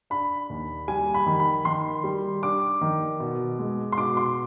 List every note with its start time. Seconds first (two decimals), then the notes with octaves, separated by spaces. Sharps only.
0.10 D4 B5
0.50 D#2
0.88 G3 G#5
1.14 B5
1.26 D#3
1.40 B5
1.65 D#3 C6
2.04 G3
2.43 D4 D6
2.81 D#3
3.20 B2
3.59 G#3
3.92 C6
3.98 B2 D6
4.17 C6